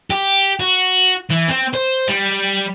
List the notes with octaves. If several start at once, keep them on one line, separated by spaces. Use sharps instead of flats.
G4
F#4
E3
C4
C5
G3